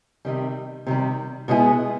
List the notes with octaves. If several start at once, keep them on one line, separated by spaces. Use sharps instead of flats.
C3 D#3 G3
C3 D#3 G3
B2 G#3 B3 E4 G#4